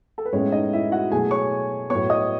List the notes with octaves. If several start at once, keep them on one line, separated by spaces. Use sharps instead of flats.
A4
B4
A2 G#3 B3 C#4 C#5
D#4 D#5
E4 E5
F#4 F#5
B2 F#3 A3 G#4 G#5
C#5 C#6
A2 F#3 B3 C#5 C#6
D#5 D#6